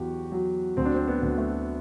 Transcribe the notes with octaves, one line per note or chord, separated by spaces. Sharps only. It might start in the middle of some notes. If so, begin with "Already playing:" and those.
Already playing: E2 F#3 F#4 G4
F#3
D2 C4
D4
C4
B3
D2
A3